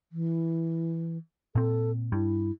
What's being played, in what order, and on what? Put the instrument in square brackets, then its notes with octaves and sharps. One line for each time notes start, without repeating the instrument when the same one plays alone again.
[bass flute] E3
[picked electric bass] A#2 C4 [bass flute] A4
[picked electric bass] G2 [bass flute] E4